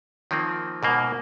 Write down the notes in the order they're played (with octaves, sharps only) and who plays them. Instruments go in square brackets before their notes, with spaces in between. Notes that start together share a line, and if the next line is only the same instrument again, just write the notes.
[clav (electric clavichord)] D#3 F3 A#3 C4
G#2 B2 A#3